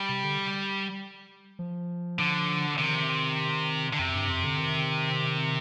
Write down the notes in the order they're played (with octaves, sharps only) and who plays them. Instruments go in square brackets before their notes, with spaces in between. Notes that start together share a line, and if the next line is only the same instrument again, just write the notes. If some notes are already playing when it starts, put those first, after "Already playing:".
Already playing: [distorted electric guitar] G3
[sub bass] C3
D3
F3
[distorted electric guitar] D3
[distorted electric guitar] C3 [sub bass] D#3
[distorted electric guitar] D3
[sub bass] F2 [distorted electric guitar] C3
[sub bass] G2
F2
D3
D#3